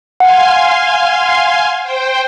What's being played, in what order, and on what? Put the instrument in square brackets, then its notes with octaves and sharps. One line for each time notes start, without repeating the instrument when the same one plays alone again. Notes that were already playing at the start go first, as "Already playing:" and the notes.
[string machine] F5 G#5 C6 [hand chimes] F#5
[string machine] C5 G5